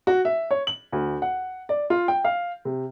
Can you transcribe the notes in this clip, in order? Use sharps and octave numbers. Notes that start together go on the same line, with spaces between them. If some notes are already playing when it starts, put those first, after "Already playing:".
F#4
E5
C#5
F#7
D2
F#5
D5
F4
G5
F5
C3